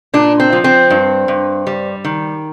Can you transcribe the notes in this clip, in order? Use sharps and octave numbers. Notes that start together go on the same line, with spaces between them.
A#2 D4
C4
F3
C4
G2
G2
G3
D#3